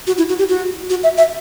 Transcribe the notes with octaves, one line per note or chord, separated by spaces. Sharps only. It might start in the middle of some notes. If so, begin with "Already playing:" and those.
F#4
E4
F#4
G4
F#4
F#4
E5
E5